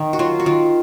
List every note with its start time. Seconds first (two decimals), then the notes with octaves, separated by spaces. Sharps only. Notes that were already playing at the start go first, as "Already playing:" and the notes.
Already playing: D#3
0.13 F#4
0.19 F#3 F4
0.40 F#4
0.46 D#3 F4